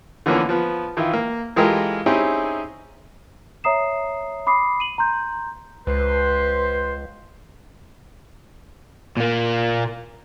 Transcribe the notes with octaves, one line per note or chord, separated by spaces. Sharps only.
D3 E3 F3 A#3 B3 C#4
F3 B3
D#3 E3 E4 F4
A#3
E3 G#3 F4 G4 A4 A#4
C4 C#4 D#4 E4 G4 G#4
C#5 E5 A#5 D#6 C7 E7
B5 D6 D#6 C7
D#7 F#7
A#5 C6 G6
C#2 B4 C5
A#2 A#3